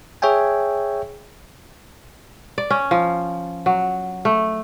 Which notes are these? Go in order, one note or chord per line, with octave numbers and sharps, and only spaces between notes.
G#4 C#5 E5 G5 G#5
D5
C#4
F3
F#3
A3